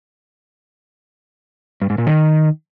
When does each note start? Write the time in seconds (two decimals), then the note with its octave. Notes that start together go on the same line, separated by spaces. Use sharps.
1.82 G2
1.90 G#2
1.98 A#2
2.07 D#3